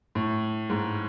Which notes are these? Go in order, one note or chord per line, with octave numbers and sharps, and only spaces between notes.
A2
G#2